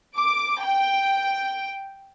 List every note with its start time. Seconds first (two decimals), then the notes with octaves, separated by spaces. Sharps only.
0.17 D6
0.65 G5